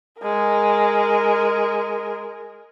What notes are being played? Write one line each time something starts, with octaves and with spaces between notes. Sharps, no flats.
G#3 A#4